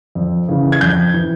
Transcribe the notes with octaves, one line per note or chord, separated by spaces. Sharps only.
F2
C#3 E3
G#6
F2 G6
E3